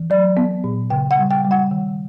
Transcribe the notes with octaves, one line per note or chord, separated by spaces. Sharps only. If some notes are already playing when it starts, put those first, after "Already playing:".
Already playing: E3
F#3 D5
B3
A#2
C#3 G5
F#5
G3
G5
G3
F#5
D#3